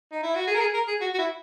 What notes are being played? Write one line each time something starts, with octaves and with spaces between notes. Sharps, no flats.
D#4
E4
F#4
G#4
A#4
G#4
A#4
G#4
F#4
F#4
E4